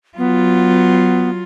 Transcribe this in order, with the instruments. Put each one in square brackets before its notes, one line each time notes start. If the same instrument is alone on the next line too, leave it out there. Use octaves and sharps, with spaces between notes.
[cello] F#3 F4 [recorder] B3